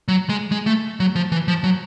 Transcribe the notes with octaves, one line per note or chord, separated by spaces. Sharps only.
F#3
G#3
G#3
A3
F#3
F3
E3
F3
F#3